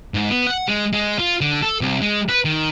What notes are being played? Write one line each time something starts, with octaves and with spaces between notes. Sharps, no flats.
G#2
B3
F#5
G#3
G#3
F4
D3
A4
C2
G#3
B4
D#3